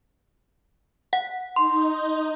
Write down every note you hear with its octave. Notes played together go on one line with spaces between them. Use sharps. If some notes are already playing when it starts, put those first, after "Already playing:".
F#5
D#4 C6